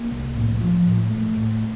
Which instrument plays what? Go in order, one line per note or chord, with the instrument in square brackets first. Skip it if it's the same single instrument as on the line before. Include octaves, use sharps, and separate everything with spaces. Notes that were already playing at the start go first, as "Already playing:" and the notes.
Already playing: [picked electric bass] A#3
C2
A2
F3
A2
A3
A2